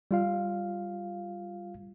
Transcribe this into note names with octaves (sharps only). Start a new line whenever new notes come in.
G3 F4 F5